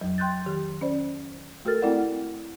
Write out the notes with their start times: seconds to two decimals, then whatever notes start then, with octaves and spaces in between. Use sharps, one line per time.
0.01 F2 F#3
0.18 G5 C6 F#6 G6 A6
0.46 D#3 G4
0.81 C#4 C5 D5
1.65 A3 F#4 A4 A#4 F6 A6
1.82 A3 C4 E4 D5 F#5